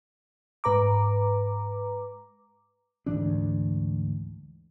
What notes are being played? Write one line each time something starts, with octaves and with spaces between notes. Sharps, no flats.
G#2 B4 A#5 D6
D2 G#2 E3 D4